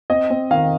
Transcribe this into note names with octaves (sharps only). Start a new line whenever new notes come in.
C4 D#5
C4
D#3 F5